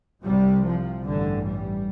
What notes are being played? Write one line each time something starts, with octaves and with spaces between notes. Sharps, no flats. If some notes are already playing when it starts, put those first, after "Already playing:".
C2 C3 G3
F3
A1 G2 D3
G3